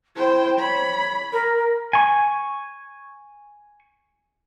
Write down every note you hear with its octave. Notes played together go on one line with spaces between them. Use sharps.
E4 C5 G5
C#5 B5
A#4
G#5 C#6